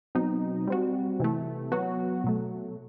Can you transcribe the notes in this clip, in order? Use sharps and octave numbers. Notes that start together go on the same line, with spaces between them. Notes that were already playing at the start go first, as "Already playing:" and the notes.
B2 F#3 C4 D#4
G3 C4 F#4
C3 E3 A3
F#3 B3 F#4
B2 F#3 A3